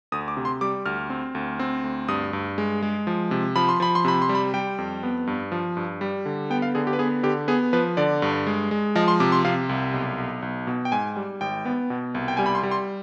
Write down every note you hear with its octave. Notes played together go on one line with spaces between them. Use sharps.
D2 D#6
D6
C3
C6
G3 D6
D2 F6
C4
D2
C4
D2
G2 D#6
G2
G#3
G#3
F3
C3
F3 B5
C6
F3 B5
C6
C3 B5
C6
G3
B5
G3 G5
F2
B3
G2
F3
G2
G3
D3
B3 G5
F5
D3 G#4
G4
B4
B3 G#4
D3 G4
B3 G#4
F3 B4
D3 D5
G2
G#3
G#3
F3 D#5
C6
C3 D6
C6
C3 F5
C2
B1
B1
B1
B2
G5
G#2 G#5
G3
G#1 G5
B3
B2
C2
G5
G3 G#5
B5
C6
G3
C6